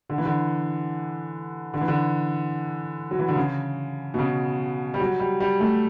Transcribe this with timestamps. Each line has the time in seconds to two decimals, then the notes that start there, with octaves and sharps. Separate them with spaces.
0.09 D3
0.18 E3
0.25 D3
1.74 D3
1.81 E3
1.88 D3
3.11 F#3
3.19 E3
3.28 D3
3.36 C#3
4.14 B2
4.19 C#3
4.94 G3
5.00 F#3
5.20 G3
5.40 G3
5.60 A3